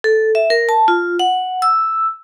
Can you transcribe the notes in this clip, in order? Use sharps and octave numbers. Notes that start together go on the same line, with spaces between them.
A4
E5
A#4
A5
F4
F#5
E6